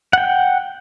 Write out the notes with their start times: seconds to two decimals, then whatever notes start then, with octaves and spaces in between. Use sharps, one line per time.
0.13 F#5 G5